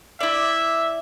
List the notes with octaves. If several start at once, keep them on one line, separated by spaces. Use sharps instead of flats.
E4 D5 E5